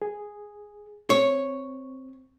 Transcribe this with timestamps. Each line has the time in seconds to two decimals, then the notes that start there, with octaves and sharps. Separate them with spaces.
0.02 G#4
1.10 C4 C#5